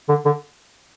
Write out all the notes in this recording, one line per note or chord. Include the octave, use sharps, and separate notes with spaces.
D3
D3